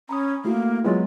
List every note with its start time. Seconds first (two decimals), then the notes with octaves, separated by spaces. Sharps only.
0.09 C#4 A#5 B5 D#6
0.44 A3 A#3 E4 F#4
0.84 F#3 G#3 B3 E4 F4